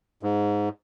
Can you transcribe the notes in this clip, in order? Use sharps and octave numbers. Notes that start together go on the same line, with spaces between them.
G#2